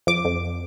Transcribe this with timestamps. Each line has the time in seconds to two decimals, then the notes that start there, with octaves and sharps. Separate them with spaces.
0.07 F2 D6
0.25 F2